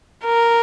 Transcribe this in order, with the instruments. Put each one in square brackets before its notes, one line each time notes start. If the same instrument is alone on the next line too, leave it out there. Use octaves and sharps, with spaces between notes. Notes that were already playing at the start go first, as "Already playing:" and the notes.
[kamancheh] A#4